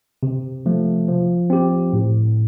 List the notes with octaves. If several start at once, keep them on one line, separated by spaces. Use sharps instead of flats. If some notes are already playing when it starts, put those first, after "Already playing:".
C3
F3 A3
F3
C4 G4
A2